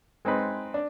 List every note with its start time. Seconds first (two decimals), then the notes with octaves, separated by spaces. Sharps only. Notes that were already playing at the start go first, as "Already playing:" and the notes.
0.25 G#3 C4 D#4 B4
0.74 D4